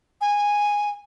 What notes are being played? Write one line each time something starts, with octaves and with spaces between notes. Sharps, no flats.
G#5